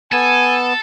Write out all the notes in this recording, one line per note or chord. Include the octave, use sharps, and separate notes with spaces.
B3 A4 G#5